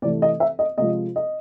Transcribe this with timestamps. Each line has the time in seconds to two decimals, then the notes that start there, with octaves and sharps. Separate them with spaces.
0.02 C3 E3 A3 D5
0.22 D#5
0.40 E5
0.59 D#5
0.78 C3 F3 G#3 D#5
1.16 D#5